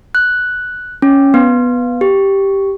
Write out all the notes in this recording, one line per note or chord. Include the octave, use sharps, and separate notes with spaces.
F#6
C#4
B3
G4